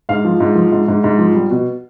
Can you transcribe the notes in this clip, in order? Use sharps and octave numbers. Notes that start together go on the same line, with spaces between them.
G#2 F5
F3
G#2
F3
G#2
G#2
G#2
F3
G3
B2